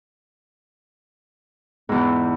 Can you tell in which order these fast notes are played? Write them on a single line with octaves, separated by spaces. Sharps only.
G#2 E2 E3